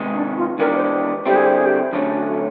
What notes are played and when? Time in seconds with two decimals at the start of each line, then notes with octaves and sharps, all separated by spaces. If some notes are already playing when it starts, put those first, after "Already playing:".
Already playing: C3 D#3 G#3 B3 D#4
0.15 D4
0.37 F4
0.59 E3 G#3 B3 D4 G4 A#4
0.76 C5
1.26 D3 G3 C4 E4 G4
1.36 G#4
1.46 G4
1.56 G#4
1.65 G4
1.93 F#2 D3 F#3 A3 C#4
2.15 F#4